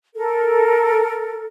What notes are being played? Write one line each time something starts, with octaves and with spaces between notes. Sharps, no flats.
A4 A#4